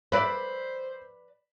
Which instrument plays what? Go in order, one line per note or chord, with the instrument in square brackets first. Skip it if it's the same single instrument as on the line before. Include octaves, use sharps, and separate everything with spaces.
[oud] B4 D5 [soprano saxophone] C5 [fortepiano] B5 E6